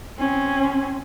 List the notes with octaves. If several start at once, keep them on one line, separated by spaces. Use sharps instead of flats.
C4 C#4